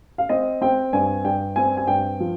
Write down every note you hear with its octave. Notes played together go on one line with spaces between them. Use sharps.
F5
C4 D#5
C4 G5
G2 G#5
G2 G5
C4 G#5
G#5
G2 G5
F3